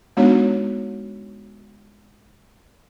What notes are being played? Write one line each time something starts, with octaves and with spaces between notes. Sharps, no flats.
G#3 B3 D4 D#4 F#4 C#5